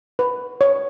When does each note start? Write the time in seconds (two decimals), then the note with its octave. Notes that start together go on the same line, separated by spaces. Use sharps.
0.19 B4
0.61 C#5